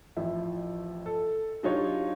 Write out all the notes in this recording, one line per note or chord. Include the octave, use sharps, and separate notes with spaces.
A1 F3 E4
A4
F#3 D4 D#4 F4 G4 C#5